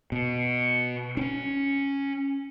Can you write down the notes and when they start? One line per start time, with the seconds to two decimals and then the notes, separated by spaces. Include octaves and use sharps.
0.12 B2
1.17 C#4 D4